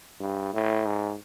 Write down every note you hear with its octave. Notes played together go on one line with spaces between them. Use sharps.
G2
A2
G#2